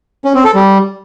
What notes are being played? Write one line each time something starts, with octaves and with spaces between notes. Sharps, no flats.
C#4
C4
A4
G3